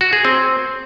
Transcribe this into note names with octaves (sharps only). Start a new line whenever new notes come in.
F#4
G#4
C4